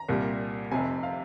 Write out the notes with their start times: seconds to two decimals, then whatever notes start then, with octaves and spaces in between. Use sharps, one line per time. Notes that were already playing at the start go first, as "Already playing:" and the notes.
Already playing: A#5
0.08 C2 A#2 G3
0.71 F1 F2 C3 G#5
1.03 F5